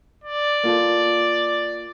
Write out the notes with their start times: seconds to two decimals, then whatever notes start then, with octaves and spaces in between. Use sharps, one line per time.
0.24 D5
0.64 A#3 F4 A4